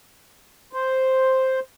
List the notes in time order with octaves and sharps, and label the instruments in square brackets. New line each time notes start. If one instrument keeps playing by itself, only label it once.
[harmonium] C5